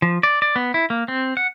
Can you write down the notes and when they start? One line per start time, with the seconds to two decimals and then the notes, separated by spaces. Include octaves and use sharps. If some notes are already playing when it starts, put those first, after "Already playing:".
0.02 F3
0.23 D5
0.42 D5
0.56 B3
0.74 E4
0.90 A#3
1.08 C4
1.37 F#5